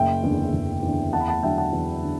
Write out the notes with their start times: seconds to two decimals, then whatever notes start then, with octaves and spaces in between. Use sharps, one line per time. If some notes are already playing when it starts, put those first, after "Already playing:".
Already playing: F#1 E5 G5
0.23 E2 D3
0.53 F#1
0.83 E2 D3
1.13 E2 F#5 A5
1.20 B5
1.28 F#5 A5
1.43 D3 F#3 E5 G5
1.58 F#5 A5
1.73 E2
2.02 D3